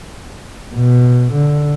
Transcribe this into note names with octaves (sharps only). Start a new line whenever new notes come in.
B2
D3